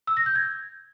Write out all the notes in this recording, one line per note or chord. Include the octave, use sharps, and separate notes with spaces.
E6
A#6
G6
G#6